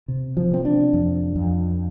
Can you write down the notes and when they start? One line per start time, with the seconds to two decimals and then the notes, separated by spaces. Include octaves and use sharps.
0.08 C3
0.37 F3
0.51 C3 C4
0.65 D4
0.93 F2
1.36 F2